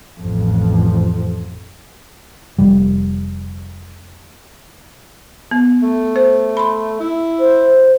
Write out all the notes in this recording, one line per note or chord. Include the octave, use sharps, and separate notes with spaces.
A1 F2
F1 G3
B3
A3
C5
B5 C6
E4
C5